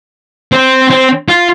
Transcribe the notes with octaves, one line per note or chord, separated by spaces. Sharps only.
C4
C4
F4